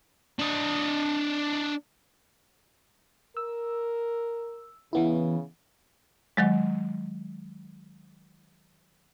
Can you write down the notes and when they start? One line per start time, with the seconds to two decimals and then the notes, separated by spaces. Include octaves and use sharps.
0.39 D4 D#5
3.37 A#4 E6
4.93 C#3 E3 B3 E4
6.37 D#3 F#3 G#3